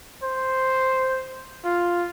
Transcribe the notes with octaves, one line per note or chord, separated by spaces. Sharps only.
C5
F4